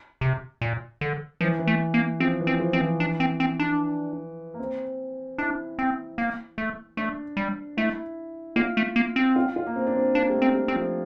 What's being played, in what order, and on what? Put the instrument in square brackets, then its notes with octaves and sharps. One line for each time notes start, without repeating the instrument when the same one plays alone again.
[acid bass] C3
A#2
D3
[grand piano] E3 [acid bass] F3
[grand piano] E3
[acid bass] A3
A#3
[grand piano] F3 [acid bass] C4
[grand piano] E3
[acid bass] C4
[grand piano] F3
[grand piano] F3 [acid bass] C4
[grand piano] E3
[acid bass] D4
C4
C4
D4
[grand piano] A#3
C4
[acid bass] D4 [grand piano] E4
[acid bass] C4
A#3
A3
[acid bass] A3 [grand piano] D4
[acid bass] G3
[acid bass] A3 [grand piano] E4
[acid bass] A#3 [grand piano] F4
[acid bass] A3
A#3
C4
[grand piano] F4
F4
A#3
C4
D4
C4
[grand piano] A#3 [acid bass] D4
[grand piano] G3
A3
[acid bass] C4
[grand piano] G3
[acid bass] C4
[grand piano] F3